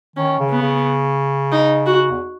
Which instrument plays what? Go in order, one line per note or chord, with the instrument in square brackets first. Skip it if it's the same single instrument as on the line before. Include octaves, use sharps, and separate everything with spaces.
[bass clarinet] D#3 [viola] C#4
[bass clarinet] C#3
[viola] B3
[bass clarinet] C#3
[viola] D#4
F#4
[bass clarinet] E2